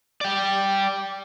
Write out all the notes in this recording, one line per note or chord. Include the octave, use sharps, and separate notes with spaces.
D5 G5